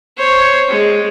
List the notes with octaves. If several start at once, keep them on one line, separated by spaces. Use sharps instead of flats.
C5 C#5
G#3